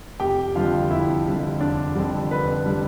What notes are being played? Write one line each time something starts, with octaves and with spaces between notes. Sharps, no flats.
F1 G4 G5
F2 D3 G3 F4 F5
F1 E4 E5
F2 D3 G3
F1 D4 D5
F2 D3 G3
F1 B4 B5
D3 G3